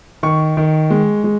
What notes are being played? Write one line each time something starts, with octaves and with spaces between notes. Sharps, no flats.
D#3 C#6
D#3
G#3
G#3